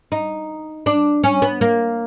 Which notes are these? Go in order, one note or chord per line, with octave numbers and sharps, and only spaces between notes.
D#4
D4
C#4
B3
A#3